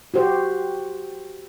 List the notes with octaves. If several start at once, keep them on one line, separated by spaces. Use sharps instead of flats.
F#4 G4 C5